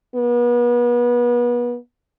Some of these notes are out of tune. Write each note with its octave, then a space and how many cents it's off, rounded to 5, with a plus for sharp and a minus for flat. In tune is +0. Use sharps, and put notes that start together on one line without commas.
B3 -35